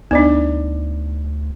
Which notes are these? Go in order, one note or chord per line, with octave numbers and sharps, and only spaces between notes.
D2 B3 D4 D#4 D5